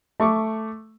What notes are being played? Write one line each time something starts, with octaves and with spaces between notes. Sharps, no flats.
A3 C#6 D6